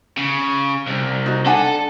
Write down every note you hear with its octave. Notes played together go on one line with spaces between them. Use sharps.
C#3
C2
D#4 F#4
D4 A4 F#5 G#5